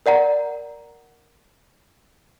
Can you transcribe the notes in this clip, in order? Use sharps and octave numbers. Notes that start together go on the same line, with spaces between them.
A#4 D5 F#5 A#5